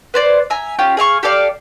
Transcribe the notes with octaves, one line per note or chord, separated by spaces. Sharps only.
B4 C5 D5
E5 G#5 A#5
C#4 F4 G4
G#4 E5 F5 C#6
G4 A4 D5 F5